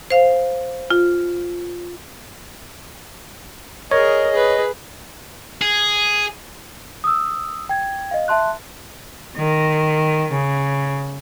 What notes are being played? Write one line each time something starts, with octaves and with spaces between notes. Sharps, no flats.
C5 F5
F4
G#4 A#4 C#5 D#5
G#4 B4
G#4
D#6 E6
G5 G#6
D#5 F5
E5 A5 C6 F#6
D#3
C#3